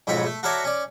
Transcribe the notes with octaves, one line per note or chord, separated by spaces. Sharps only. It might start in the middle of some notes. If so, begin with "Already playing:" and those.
B1 F2 G#2 C4 C#5 B5
A3
F#4 A4 A#4 C#5 D5 E5
C#4 D5